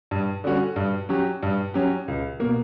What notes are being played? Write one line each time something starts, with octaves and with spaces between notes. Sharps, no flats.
G2
D3 G3 C#4 F#4
G2
F#3 C#4 G4
G2
F#3 C#4 G4
C#2
B2 A#3